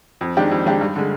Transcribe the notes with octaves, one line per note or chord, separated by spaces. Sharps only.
F2
D#3 G#3 D4 G4
F2
D#3 G#3 D4 G4
G2
D3 G#3